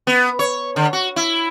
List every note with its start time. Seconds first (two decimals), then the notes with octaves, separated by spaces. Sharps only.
0.07 B3
0.39 C#5
0.76 D3
0.93 F#4
1.16 E4